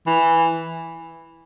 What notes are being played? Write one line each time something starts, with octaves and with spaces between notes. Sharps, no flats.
E3